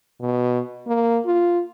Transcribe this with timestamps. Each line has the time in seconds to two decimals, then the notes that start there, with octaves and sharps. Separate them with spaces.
0.20 B2
0.87 A#3
1.26 F4